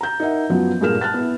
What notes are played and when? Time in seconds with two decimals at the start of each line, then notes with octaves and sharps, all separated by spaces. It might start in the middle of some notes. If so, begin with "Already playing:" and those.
0.01 A#5 G6
0.20 D#4 A#4 E5 F#5
0.50 F#2 F3 F#3 B3
0.81 G2 A#2 G#4 A#4 F6 E7
1.01 A5 F6 F#6 A6
1.14 B3 E4